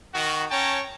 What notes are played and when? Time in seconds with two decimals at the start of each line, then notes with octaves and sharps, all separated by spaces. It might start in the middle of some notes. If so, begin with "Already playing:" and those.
0.14 D#3 F#4
0.51 C#4 C#5 G5 A5 A#5